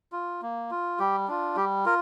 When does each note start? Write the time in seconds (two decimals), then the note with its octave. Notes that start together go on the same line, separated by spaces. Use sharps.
0.12 F4
0.42 A#3
0.71 F4
0.99 G3 G4
1.28 D4 F4
1.56 G3 G4
1.85 F4 A#4